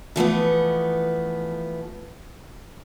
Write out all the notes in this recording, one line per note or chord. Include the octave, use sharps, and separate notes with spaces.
E3 F3 A3 B3